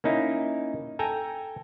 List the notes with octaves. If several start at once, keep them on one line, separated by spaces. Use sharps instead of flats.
A#3 C#4 D#4 E4
A4 G5 G#5 A#5